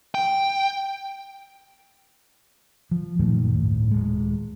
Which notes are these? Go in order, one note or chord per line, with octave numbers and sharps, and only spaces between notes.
G5
F3
F#2 A#2 D#3 A3
D1 G1 A2
D#1 G#3